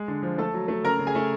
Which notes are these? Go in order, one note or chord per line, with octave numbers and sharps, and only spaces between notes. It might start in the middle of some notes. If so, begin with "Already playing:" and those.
Already playing: G#3
D3
F3
A3 A4 A5
F#3
A3
C#3 A#4 A#5
C#3
G#4 G#5
A3